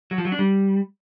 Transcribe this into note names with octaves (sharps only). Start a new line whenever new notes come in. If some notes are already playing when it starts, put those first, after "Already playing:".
F#3
F3
F#3
D4
G3